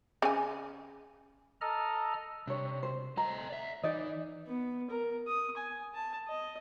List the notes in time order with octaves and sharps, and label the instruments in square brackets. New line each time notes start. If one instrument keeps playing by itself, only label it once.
[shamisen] C#3 G#5
[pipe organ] A4 D#5 A#5 F6
[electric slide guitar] C3 [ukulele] D4 C#5
[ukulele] C5
[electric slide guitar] A3 A4 D#5 [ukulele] A#5
[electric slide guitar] D5 E5
[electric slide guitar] E3 [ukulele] D#4 D5 D#5
[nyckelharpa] B3
A#4
D#6
G#5
A5
D#5